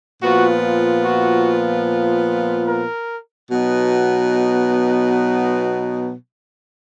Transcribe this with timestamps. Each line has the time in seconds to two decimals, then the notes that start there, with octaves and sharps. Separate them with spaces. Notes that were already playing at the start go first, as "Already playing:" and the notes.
0.22 A#2 F3 B3 F4 F#4
1.04 F#4
2.67 A#4
3.49 B2 F#3 B3 D#4